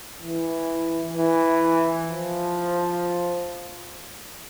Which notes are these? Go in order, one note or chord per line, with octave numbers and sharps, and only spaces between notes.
E3
E3
F3